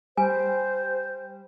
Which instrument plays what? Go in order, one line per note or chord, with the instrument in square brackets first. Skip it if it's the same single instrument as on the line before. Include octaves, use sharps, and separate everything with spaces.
[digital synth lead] G3 [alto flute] C5 [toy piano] G#5